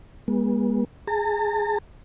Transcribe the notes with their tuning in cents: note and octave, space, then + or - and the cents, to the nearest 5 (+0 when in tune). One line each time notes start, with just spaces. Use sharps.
G#3 -25 B3 -40
G#4 +0 A5 +45